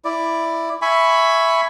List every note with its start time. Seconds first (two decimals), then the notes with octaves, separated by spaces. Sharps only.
0.05 E4 D5
0.82 E5 G#5 B5 C#6